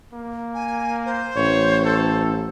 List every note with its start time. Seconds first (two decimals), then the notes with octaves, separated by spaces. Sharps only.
0.13 A#3
0.54 G#5
1.05 C5
1.36 A1 C#5
1.85 A4